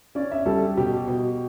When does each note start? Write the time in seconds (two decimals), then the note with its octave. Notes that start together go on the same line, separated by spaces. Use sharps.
0.15 C#4 D5
0.31 E5
0.46 G3 A4
0.77 B2 G4
1.08 B2